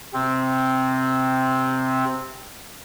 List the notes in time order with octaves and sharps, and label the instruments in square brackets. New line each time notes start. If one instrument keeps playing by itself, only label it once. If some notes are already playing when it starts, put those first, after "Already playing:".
[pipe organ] C3 C4